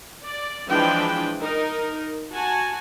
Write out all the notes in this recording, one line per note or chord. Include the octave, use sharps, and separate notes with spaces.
D5
E3 F3 G#3 D4 B4 G5
D#4 A#4
F#4 G#5 A5